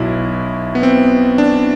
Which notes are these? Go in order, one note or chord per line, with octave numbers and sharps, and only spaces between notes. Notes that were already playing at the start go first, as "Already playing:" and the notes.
Already playing: B1 B2 E4
B3
C4
D4